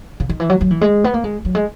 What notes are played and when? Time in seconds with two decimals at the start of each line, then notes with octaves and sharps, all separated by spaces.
0.20 C#3
0.29 D#3
0.40 E3
0.50 F#3
0.61 F#3
0.71 E3
0.81 G#3
1.04 B3
1.14 A#3
1.24 G#3
1.45 F#3
1.55 G#3